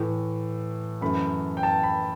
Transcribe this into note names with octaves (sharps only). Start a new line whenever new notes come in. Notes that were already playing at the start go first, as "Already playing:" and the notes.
Already playing: A2 E3 A3
F#2 E3 A3 B5
G5
A5
B5